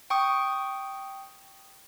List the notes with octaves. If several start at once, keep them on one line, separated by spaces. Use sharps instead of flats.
G5 C#6 D#6